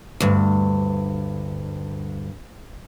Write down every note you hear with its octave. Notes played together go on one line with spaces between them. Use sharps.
D2 G2